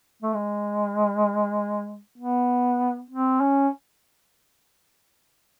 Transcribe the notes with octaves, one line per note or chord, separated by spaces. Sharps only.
A3
G#3
B3
C4
C#4